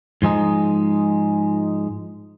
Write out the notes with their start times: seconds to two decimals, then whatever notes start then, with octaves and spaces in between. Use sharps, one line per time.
0.22 G#2 F3 G#3 D#4